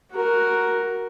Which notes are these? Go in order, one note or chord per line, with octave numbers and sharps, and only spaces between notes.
F#4 A#4